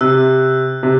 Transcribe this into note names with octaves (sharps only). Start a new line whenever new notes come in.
C3 E6 F#6
C3